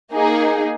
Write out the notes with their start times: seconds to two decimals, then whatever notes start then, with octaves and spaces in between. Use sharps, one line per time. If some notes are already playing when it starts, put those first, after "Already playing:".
0.13 A#3 D#4 G#4